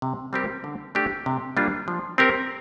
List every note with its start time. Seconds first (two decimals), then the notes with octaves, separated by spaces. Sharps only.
0.02 C3
0.33 G3 C4 G4 A#4
0.64 D3
0.95 A3 D4 G4
1.26 C3
1.57 G3 A#3 D4 F4
1.88 F3
2.18 C4 G4 A#4